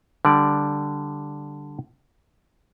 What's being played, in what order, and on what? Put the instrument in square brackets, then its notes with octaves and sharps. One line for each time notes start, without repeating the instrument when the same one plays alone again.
[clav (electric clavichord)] D3 G3 D5